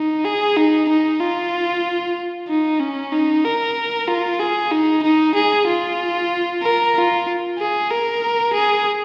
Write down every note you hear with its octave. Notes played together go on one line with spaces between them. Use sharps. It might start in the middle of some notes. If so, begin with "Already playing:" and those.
Already playing: D#4
G#4
D#4
D#4
F4
D#4
C#4
D#4
A#4
F4
G#4
D#4
D#4
G#4
F4
A#4
F4
G#4
A#4
G#4